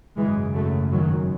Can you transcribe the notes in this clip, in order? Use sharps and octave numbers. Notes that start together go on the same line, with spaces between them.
G#1 F#2 C#3 E3 G#3
F#3 A3
D#3 F#3